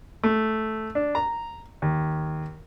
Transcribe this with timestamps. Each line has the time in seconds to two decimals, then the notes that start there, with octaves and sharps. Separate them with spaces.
0.24 A3
0.95 D4
1.15 A#5
1.82 D#2